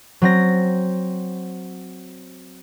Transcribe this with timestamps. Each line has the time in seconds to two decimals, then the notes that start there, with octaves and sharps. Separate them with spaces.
0.22 F#3 C4 A#6